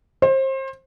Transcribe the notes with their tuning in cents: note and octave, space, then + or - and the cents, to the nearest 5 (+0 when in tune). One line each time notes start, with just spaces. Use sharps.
C5 +30